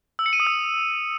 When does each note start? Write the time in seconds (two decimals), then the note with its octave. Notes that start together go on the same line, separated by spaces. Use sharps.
0.19 E6
0.26 C#7
0.33 D#7
0.40 D#6
0.47 E6